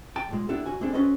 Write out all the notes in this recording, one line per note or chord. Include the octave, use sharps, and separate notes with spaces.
G5 A5
B1 A#2 G#3
B3 D4 E4 G4 A4
D2 F#4 G#5
A#3 C4 D4 G#4 A4
C#4 F#4 A4 B4 C5 D#5